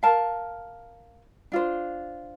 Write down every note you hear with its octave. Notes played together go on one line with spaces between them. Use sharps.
A#4 F5 A5
D4 F4 C5